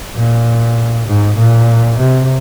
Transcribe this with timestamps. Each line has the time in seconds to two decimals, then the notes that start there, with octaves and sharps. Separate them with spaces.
0.16 A#2
1.07 G#2
1.38 A#2
1.99 C3